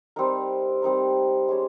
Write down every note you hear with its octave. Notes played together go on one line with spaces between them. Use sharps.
G3 C4 D#4 A#4
G3 C4 D#4 A#4
G#3 C#4 G4 C#5